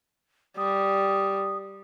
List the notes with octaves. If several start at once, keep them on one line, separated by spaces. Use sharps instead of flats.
G3 D#6